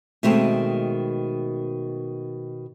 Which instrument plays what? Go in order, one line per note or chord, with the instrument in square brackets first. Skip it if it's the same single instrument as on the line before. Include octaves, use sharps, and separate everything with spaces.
[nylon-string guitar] B2 D#3 G#3 A3 C4